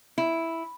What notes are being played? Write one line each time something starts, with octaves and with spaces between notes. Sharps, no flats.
E4